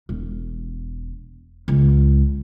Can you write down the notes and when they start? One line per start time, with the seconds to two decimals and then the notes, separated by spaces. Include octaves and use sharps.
0.09 E1
1.68 C#2